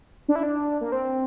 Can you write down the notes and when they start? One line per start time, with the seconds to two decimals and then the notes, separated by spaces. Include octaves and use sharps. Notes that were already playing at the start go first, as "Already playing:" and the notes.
0.28 D4
0.36 E4
0.43 D4
0.81 A#3
0.92 C4